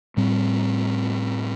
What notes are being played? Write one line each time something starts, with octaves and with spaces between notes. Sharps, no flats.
A2 G3 C4